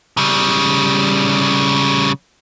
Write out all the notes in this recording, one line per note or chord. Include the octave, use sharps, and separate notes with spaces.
C#3 G3